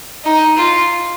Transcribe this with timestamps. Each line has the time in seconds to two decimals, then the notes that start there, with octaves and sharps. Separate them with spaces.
0.24 D#4
0.56 F4